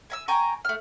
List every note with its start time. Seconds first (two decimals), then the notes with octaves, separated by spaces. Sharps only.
0.10 G#5 A#5 E6
0.28 G5 G#5 A#5 C#6
0.65 A3 F6